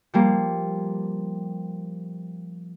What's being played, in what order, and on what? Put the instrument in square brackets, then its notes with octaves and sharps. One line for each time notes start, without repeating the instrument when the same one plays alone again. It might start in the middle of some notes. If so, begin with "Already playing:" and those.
[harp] F3 G3 A#3